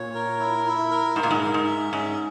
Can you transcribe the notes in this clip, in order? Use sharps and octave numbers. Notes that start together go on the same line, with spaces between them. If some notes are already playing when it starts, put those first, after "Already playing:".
Already playing: A#2 C#5
A#4
E4
E4
A#4
G#2 A#4
A#2
G#2
A#4
G#2
E5
G#2 C#4